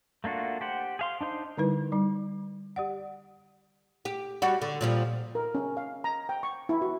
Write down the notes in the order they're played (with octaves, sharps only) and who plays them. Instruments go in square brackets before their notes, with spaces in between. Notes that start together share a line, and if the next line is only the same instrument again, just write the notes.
[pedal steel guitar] A3 A#3 D4 F4 F#4
G4 C5 F#5
G#4 F5 C6
D4 D#4 C5 C6
[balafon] D3 G3 D#4 E4 B4
G3 D#4
G4 D5 F#5
[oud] G4
G3 F#4
D3
A#2 F3 G3
[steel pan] A#4
C#4
F5
A#5
G5
C#6
E4
F#4